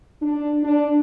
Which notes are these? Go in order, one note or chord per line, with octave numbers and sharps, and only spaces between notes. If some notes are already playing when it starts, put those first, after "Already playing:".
D4
D4